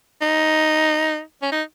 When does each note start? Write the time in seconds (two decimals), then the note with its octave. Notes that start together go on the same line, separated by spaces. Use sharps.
0.22 D#4
1.42 C#4
1.52 D#4